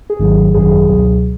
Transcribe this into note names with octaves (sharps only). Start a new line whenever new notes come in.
G#4
G#1 G#2 D#3 F#3
G#1 F#2 D#3 F#3 G#4
C#2 B2 F#3